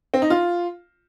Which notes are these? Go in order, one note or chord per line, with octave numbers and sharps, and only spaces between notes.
C4
D#4
F4